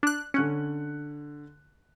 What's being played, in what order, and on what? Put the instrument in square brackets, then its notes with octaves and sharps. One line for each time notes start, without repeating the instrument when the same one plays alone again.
[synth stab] D4 F#6
[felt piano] D3 F#6 C#7 [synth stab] C#4